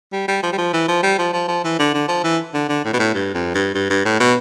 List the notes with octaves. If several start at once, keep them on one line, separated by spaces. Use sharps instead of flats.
G3
G3
F3
G3
F3
E3
F3
G3
F3
F3
F3
E3
D3
D3
F3
E3
D3
D3
A2
B2
A2
G2
F2
G2
G2
G2
A2
B2